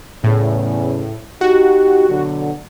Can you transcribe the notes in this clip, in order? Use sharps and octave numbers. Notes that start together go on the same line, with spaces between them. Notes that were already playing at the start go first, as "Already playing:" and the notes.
E2 A2 C#3
D#4 F#4 G4
B2 D3 F#3